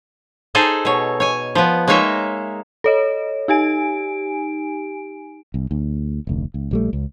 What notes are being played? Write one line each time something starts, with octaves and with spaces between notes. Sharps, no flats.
D#4 G#4 A4 C5
B2 C#5
C#5 G#5
F3 B3
G#3 A#3 D#4 C#5 E5
A4 C#5 D#5
D#4 G4 G#5 D7
C2
D2
F1 D2
C#2
A#1 G3 A3
C#2